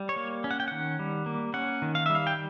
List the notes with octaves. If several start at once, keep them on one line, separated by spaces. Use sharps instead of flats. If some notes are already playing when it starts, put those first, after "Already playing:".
Already playing: G3
C#5
A#3
C#4
F#5
G5
D#3 F#5
G3
A#3
C#4 F#5
D#3
F5
G3 E5
F5
G5